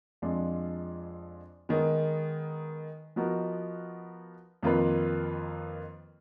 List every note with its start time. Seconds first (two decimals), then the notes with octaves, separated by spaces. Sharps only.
0.22 F2 F3 G#3 D4 F4
1.69 D#3 G#3 B3
3.16 F3 B3 D#4 F#4 A#4
4.63 F2 D#3 A#3 F4 B4